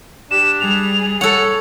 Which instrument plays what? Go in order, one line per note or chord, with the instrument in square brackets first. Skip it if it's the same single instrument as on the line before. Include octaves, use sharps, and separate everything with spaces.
[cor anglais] D4 [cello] G4 [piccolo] E7
[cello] G3 G#4 [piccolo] F7
[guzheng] A4 F#5 [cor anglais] C#5 [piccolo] F7